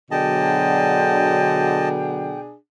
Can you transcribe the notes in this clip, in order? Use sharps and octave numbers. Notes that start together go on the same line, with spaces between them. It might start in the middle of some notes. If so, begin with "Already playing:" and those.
B2 D3 F#3 D4 G#4 D#5 G5 A5